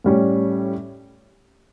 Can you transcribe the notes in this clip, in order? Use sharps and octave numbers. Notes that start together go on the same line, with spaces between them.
A2 G3 C#4